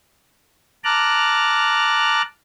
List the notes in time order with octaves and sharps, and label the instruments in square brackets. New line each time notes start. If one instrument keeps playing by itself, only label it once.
[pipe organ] A5 A#5 D6 F6 F#6